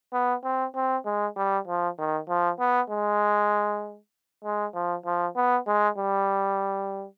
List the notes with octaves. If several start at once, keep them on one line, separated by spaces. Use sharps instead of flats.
B3
C4
C4
G#3
G3
F3
D#3
F3
B3
G#3
G#3
F3
F3
B3
G#3
G3